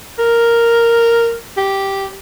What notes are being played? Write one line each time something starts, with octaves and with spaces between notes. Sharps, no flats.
A#4
G4